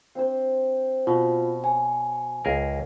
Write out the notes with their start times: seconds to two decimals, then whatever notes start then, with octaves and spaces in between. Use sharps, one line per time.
0.15 C4 D4 C5
1.07 B2 F4
1.64 C#5 G#5
2.45 C#2 G#4 A#4